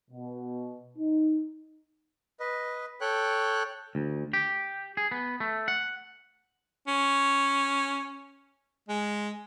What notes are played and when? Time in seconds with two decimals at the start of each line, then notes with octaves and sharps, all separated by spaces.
0.10 B2
0.97 D#4
2.40 B4 D#5
3.01 A4 C#5 G5 F#6
3.95 D2
4.33 G4
4.97 G#4
5.11 B3
5.40 A3
5.68 F#5
6.87 C#4
8.89 G#3